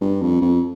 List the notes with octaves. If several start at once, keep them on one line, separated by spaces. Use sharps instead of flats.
G2
F2
F2